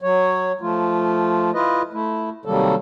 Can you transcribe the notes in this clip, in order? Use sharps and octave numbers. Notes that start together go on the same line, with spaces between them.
F#3 C#5
F3 A3 F4
E4 F4 B4 D#5
A3 E4
C3 D#3 F#3 G3 A#3 A4